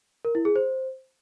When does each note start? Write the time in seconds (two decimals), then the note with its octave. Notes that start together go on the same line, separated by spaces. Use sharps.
0.25 A#4
0.35 E4
0.45 G#4
0.56 C5